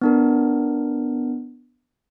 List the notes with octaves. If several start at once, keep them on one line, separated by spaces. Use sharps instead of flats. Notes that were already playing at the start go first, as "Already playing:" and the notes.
B3 D4 A#4